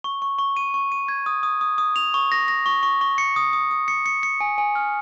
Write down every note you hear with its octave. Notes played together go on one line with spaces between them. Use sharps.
C#6
C#6
C#6
D#7
C#6
D#7
G#6
D#6
D#6
D#6
D#6
F7
C#6
A#6
A#6
C#6
C#6
C#6
C#7
D#6
D#6
D#6
C#7
C#7
C#7
G#5
G#5
F6